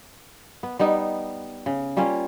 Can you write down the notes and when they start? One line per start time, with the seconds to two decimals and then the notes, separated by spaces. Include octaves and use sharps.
0.63 B3
0.79 G3 B3 D#4
1.66 C#3
1.97 G3 A#3 C#4 F4